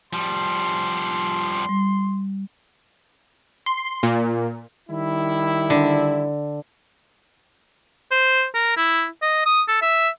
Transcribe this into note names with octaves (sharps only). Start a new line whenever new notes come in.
F3 G3 C6
G3
C6
A#2
D#3 G3 E4
D3
C5
A#4
E4
D#5
D#6
A4
E5